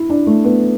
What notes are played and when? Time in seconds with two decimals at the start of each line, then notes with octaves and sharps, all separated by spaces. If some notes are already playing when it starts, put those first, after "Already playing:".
Already playing: E4
0.10 D4
0.27 A3
0.44 B3